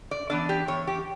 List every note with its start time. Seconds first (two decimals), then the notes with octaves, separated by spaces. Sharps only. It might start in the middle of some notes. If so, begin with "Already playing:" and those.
0.11 D5
0.30 E3 B3 D4 D5
0.49 G4
0.68 E2 C#5
0.87 G4